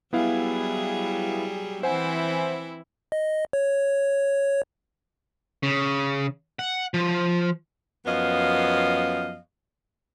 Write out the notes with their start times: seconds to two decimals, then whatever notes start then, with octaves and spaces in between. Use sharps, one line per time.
0.13 F#3 G3 B3 E4 G#4 F5
1.83 E3 C4 E4 C5 F#5 G#5
3.12 D#5
3.53 C#5
5.63 C#3
6.59 F#5
6.94 F3
8.06 F#2 F3 B3 D#5 F5